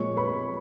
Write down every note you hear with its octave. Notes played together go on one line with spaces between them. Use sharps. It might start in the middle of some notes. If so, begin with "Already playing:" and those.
Already playing: A#2 F3 G#3 C#5 C#6
B4 B5